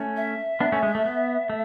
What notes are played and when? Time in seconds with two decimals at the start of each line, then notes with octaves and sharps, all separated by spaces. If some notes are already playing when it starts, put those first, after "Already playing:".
Already playing: A3 C#4
0.16 E5
0.60 B3 D4
0.72 A3 C#4
0.83 G#3
0.95 A3
1.05 B3
1.50 A3